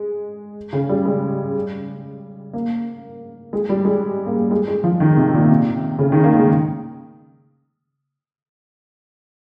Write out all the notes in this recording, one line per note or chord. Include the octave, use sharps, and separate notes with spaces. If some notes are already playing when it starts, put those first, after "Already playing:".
Already playing: G#3
C#3
G3
G#3
A#3
G#3
G3
G#3
A#3
G#3
G#3
F3
D#3
C3
A#2
C3
C#3
D#3
A#3
G#3